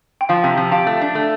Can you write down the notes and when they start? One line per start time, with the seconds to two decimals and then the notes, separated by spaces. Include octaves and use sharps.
0.21 G5
0.29 F3 F5
0.44 C3
0.57 F3
0.72 G4 F5 A5
0.87 A3
1.01 D4
1.15 A3